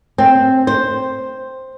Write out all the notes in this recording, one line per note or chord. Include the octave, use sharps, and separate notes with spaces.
C4
C5